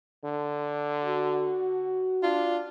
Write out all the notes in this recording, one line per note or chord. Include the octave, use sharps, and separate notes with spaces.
D3
F#4
D4 F4